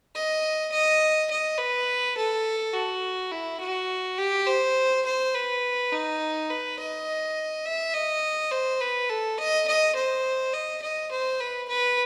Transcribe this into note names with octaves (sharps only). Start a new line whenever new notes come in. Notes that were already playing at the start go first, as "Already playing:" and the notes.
D#5
D#5
D#5
B4
A4
F#4
E4
F#4
G4
C5
C5
B4
D#4
B4
D#5
E5
D#5
C5
B4
A4
D#5
D#5
C5
D#5
D#5
C5
B4
B4